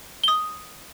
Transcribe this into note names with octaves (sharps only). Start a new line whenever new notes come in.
D#6 G7